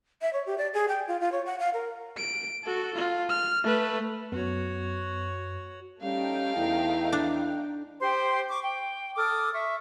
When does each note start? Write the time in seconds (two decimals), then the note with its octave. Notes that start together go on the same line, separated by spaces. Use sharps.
0.22 E5
0.33 C#5
0.46 G4
0.58 D5
0.74 G#4
0.88 G5
1.08 F4
1.21 F4
1.32 C#5
1.46 F#5
1.59 F5
1.74 A#4
2.17 D7
2.63 F#4 A4
2.96 F4
3.29 F6
3.64 A3 B4
4.32 F#2 B3 F#4 C#5
6.02 G3 A3 C#4 D#4 F5 G5
6.56 E2 E4
7.12 D4
8.00 G4 C5 G5 C6
8.48 C#6 D6
8.62 G5
9.16 A4 D6 D#6 F6
9.53 E5 C#6